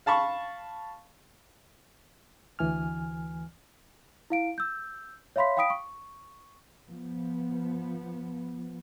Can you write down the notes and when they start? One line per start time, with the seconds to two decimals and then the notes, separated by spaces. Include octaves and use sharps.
0.06 F5 A5 B5 C#6
2.59 D2 E3 G#5 F6
4.30 E4 F5 D7
4.58 E6 G6
5.36 C#5 E5 F5 B5 C6 B6
5.57 F5 G5 B5 D#6 B6 D7
5.70 C#6
6.87 F3 B3